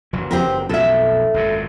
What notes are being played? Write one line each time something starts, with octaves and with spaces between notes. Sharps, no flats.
F#1 E3 F#3
C4 G4 A#4
B1 F2 A4 E5
G#1 F#2 A#2